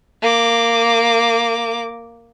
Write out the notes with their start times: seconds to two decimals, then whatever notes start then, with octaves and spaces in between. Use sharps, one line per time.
0.22 A#3 D6